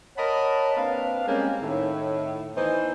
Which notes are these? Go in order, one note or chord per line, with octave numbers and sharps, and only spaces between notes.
A#4 C#5 D#5 F#5 A5 B5
A#3 C4 D4 B4 F5
G3 G#3 A#3 C4 C#4
A2 D#3
E3 B3 D#4 C5